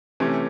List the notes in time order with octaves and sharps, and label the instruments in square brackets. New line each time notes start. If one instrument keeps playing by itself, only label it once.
[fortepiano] C3 [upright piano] E3 A3 C#4